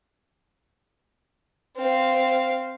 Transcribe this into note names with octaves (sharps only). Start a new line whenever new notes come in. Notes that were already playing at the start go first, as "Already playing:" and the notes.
C4 F5